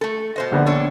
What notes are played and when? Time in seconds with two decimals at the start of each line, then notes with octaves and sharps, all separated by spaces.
0.01 A3 A4
0.36 B2 C5 D#5
0.51 A#1 D3 B3
0.66 D4 A4 C#5